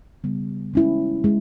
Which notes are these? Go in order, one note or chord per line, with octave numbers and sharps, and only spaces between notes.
C#3 G3 B3
G#3 C#4 E4
G#3